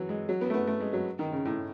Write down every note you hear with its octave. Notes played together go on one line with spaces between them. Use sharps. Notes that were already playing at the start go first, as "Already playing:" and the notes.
Already playing: E3 F#3
G#3
F#3
B3
A3
B3
A3
G#3
F#3
D#3
C#3
A2